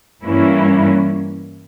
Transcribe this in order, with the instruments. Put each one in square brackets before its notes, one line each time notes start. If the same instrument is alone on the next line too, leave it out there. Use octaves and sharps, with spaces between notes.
[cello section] G2 E3 A#3 C#4 E4